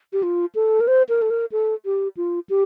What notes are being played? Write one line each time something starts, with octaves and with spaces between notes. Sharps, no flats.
G4
F4
A4
A#4
C5
A#4
A4
A#4
A4
G4
F4
G4